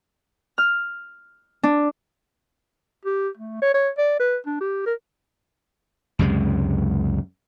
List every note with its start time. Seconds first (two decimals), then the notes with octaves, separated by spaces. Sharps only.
0.58 F6
1.63 D4
3.05 G4
3.37 A3
3.62 C#5
3.74 C#5
3.98 D5
4.19 B4
4.46 D4
4.60 G4
4.86 A#4
6.19 C#2 F#2 C3 G#3